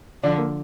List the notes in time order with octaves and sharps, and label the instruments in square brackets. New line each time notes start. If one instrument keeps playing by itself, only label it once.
[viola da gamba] D3 F3 [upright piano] D4
[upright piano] A#3